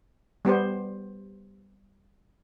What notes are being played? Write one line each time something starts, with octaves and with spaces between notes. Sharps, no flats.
G3 B3 G4 C5